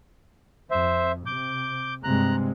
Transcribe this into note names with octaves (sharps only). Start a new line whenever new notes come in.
F2 C5 E5
C3 D6 G6
G2 C3 G#3 A#5 F#6